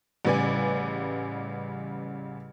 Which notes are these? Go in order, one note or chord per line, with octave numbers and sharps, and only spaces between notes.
A1 C#3 G3 B4 D5 G#5